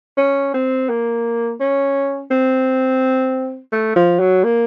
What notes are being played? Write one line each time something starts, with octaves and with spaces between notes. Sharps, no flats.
C#4
C4
A#3
C#4
C4
A3
F3
F#3
A#3